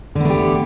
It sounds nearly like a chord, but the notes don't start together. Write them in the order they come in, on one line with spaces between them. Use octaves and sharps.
D3 B3 A3 G4